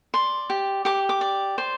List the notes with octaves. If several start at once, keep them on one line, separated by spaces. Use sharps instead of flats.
D5 C6
G4
G4 D6
D6
D5
C5